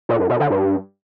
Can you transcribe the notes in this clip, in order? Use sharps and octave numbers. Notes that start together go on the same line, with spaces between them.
A#2
F#2
B2
D3
G2